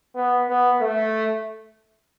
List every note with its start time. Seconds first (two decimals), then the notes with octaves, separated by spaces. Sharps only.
0.16 B3
0.49 B3
0.81 A3